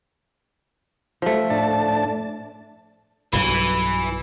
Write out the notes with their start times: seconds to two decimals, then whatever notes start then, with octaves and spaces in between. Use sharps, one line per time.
1.22 F3 A3
1.50 A2 D4 A5
3.33 B1 G2 E3 F#3